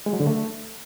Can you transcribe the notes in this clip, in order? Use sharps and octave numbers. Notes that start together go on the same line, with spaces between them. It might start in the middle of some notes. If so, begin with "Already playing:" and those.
G#3
F#3
D3
A3